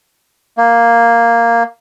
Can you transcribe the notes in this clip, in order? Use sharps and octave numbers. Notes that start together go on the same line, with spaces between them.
A#3